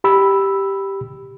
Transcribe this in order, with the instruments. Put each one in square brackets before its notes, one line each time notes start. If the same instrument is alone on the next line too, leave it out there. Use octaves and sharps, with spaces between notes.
[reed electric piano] G4 B5 E6